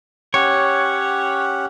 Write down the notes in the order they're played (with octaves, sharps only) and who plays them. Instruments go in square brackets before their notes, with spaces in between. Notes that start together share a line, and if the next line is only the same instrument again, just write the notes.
[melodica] C#4 G4 F#5 [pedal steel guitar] C#5